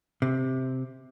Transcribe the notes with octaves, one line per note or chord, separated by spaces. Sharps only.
C3